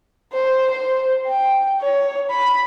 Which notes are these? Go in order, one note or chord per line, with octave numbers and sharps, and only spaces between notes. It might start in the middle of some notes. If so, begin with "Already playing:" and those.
C5
C5
G5
C#5
B5